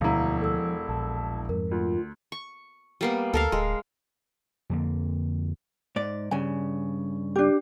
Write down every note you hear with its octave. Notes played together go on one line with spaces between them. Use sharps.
E1 D2 B2 F3 E4 F5 A#5
A4 E6
A#1 A5
F2 G#2 A#4
D2 F4
C#6
G3 A#3 B3
D2 A4 A#4 F5
D1 G#3
F2 D3 A#3
G#2 D5
G2 C#3 G#5
D4 G4